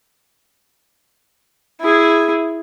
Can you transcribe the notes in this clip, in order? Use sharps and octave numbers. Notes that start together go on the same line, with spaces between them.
E4 G#4